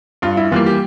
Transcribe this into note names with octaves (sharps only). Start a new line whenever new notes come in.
G2 F4
E4
E3 G3 A#3 F4
G4